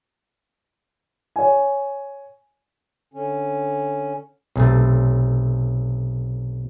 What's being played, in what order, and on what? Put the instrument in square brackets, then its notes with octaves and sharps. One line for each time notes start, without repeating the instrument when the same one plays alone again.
[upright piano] C#5 G#5
[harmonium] D3 C#4
[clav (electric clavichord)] B1 C3 A3